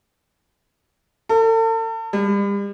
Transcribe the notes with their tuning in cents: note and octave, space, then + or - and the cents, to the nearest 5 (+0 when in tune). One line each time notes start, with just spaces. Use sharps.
A4 +40
G3 +40